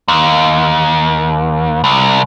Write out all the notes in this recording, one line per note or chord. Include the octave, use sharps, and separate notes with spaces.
D#2
C2